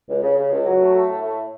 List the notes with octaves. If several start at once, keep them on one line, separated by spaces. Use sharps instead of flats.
C#2
C#3
C#3
C#2
F#3
A3
A3
A2
A3